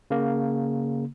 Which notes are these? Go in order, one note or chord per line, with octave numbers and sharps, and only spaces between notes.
C#3 A#3